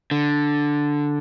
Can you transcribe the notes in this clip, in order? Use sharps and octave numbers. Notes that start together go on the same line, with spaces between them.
D3